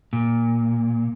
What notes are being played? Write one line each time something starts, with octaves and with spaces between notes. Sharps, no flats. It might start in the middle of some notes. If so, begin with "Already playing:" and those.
A#2